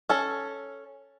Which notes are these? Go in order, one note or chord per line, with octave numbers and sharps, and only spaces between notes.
C#4 A4